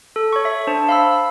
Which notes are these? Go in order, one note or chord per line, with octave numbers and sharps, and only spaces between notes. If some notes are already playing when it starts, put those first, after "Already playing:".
A4
C#5 C#6
E5
D4 C5 A5
F5 B5 E6